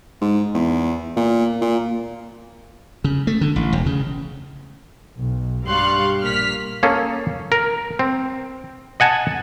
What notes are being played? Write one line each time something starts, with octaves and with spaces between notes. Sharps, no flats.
G#2
E2
A#2
A#2
C#3
A3
D3
A1
E1
C#3
B1
G2 G3 F5 C6 C#6 F#6
A#1 A#3 F6 B6
A#3 C#4 G#4 A4
A#4
C4
D#5 F#5 G#5 A5